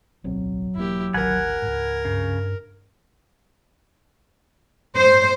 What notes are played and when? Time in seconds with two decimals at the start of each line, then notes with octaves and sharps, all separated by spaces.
0.24 D1 B1 F#3 C4
0.75 E1 A#3 E4 G4
1.14 G#1 D2 A#4 F#5 G#5 B5
1.62 C#2 G#2
2.05 G2 C#3
4.96 C5